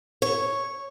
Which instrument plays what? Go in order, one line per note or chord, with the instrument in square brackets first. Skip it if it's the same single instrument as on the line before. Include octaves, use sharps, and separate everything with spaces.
[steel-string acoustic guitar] C#5